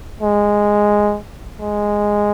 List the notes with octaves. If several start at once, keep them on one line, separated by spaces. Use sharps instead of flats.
G#3
G#3